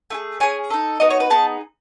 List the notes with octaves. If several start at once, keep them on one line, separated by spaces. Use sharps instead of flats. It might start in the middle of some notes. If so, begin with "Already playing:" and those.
A3 E4 G#4
C#4 G#4 G#5
D#4 A4
B3 D#4 F#4 D#5
C#5
B4
B3 D#4 G#4 A5